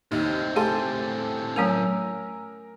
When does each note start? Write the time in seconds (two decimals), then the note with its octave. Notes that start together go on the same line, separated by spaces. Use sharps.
0.12 D#2 A2 C4 D#4 D#5
0.56 A3 G4 A4 G#5 A5 C6 A6
1.56 F#3 A3 C#4 A#4 G#5 A#5 E6